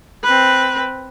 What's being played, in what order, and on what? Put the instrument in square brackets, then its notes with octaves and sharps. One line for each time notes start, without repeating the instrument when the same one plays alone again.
[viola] C4 B4